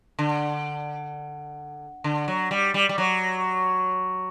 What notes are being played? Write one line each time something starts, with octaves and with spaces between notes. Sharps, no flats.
D3
D3
F#3
G3
G3
G3
F#3